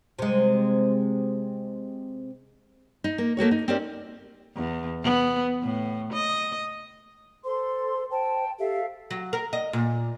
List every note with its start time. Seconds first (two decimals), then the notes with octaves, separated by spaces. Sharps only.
0.19 C3 G#3
3.04 D#4
3.18 A#3
3.37 A3 A#3 F#4 C#5
3.51 D#4
3.68 C4 C#4 D#4 G4 A#4 D5
4.56 E2
5.03 B3
5.63 A2
6.13 D#5
7.44 A4 C5 C6
8.11 C5 G5 A5
8.59 G4 A4 E5 F5
9.11 F#3
9.33 A#4
9.53 D#5
9.73 A#2